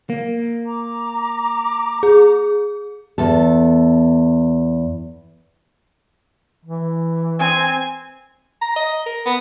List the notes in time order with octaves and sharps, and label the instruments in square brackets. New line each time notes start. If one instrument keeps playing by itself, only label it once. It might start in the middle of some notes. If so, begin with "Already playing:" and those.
[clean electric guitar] A#3
[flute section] A#5 D6
[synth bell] G#4
[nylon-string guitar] E2 A4
[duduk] E3
[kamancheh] C4 G#5
[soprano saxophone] A#5
D#5
A#4
B3